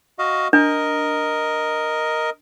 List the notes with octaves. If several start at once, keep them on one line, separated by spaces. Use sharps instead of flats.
F#4 D#5 F5
D4 A#4 D#5